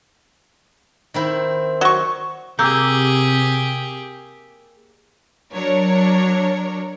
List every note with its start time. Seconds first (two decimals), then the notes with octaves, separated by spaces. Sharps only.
1.14 D#3 C4 E4
1.81 F#3 C#6
2.59 C3 A#3 G4 G#4 D6 E6 G6
5.53 F#3 D4 A#4 C#5